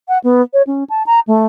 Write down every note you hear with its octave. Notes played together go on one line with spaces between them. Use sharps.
F#5
B3
C#5
C#4
A5
A#5
A3